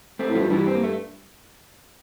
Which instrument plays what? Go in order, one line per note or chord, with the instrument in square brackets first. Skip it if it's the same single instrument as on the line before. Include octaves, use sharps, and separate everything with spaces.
[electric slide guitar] A3 C4
[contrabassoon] A2
[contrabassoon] G2 [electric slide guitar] F3 A3
[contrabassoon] G2 [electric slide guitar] E3 G3
[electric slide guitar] C4
A#3
A3